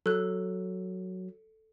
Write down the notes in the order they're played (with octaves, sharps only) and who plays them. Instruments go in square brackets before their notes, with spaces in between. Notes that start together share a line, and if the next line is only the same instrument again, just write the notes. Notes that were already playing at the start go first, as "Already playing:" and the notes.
[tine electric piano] F#3 [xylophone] A4 F#6